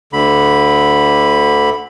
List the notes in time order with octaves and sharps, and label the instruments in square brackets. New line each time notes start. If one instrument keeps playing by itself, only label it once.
[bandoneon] D2 D3 B5